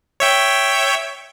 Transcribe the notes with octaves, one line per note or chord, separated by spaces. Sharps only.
C#5 E5 G5